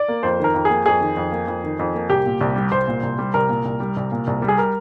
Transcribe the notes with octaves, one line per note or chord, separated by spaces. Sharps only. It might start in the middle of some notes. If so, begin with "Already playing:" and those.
Already playing: D5
A#3
F2 C5
D#3 A#4
F2
A#3 G#4
F2 G#4
D#3
F2
A#3
F2
D#3
F2
A#3
C2 G4
A#2
C2
G3
C2 C5
A#2
C2
G3
C2 A#4
A#2
C2
G3
C2
A#2
C2
G3
G#4
A#4